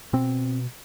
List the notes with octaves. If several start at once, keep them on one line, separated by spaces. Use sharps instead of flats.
B2 C4